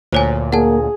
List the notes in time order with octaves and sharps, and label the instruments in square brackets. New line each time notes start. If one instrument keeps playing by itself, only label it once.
[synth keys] D2 A#2 [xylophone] C5 C#5 G#5
[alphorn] A#3 [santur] G#4 [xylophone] F#5 A5